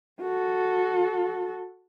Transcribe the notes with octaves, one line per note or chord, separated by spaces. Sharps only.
F#4 A4